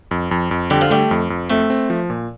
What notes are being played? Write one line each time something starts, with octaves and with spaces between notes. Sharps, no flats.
F2
F2
F2
D3 G3
F3
G3 A3
F2
F2
A3 C4
C4
F3
A#2